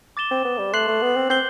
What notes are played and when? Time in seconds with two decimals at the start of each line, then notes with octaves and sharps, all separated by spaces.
0.17 D6 A6 E7 G7
0.31 C4
0.44 B3
0.59 G3
0.73 A3 C6 F#6 C7 F#7
0.88 A3
1.02 B3
1.16 C4
1.30 C4 G6 C7 G7